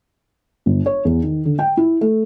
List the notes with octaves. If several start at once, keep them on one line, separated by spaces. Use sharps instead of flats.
G1
C#5
E2
D#3
D3
G5
E4
A3